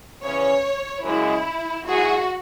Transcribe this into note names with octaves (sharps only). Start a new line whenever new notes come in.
E2 C#3 E3 C#4 C#5
F#2 C#3 G#3 E4
G#2 F#3 E4 F#4 G#4